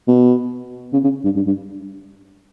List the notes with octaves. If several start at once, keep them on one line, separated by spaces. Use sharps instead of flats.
B2
C#3
C#3
G2
G2
G2